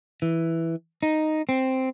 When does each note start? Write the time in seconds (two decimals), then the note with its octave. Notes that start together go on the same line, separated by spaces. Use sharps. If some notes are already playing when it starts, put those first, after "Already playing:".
0.22 E3
1.03 D#4
1.49 C4